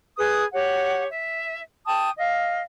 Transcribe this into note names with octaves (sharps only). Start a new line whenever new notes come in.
G#4 B4 D#6
G4 C#5 F#5
E5
G5 A5 D#6
D#5 F5